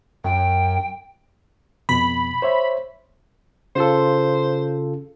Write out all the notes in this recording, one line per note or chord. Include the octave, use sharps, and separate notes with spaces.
F#2 G5
F2 B2 B5
C5 C#5 E5
C#3 F4 A4 C5